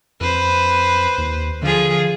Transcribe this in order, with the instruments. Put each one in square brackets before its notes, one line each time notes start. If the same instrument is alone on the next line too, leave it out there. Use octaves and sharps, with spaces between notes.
[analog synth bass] F2 [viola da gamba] B4 C5
[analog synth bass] D#2
[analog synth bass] D3 [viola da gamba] F3 F4 G#4